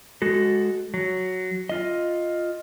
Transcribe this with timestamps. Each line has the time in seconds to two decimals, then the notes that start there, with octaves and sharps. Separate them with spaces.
0.22 G#3 F#4 A4
0.94 F#3
1.69 F4 D#5